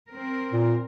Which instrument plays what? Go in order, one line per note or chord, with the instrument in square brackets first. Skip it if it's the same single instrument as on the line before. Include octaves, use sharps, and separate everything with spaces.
[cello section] C4 A#4
[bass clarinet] A#2